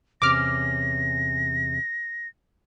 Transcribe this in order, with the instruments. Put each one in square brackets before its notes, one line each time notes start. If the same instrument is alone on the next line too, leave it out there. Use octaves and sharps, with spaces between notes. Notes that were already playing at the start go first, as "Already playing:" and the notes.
[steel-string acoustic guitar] E2 C3 C#4 [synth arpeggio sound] D6 F6 [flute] A#6